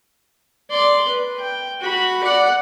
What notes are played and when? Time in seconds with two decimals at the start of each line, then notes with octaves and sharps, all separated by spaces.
0.70 D5 C6
1.08 B4
1.39 G5
1.81 F#4 B5
2.23 D5 F#5